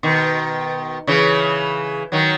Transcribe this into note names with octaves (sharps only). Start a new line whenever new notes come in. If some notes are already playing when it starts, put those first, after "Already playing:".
B2 D#3
C#3 E3
D#3 F#3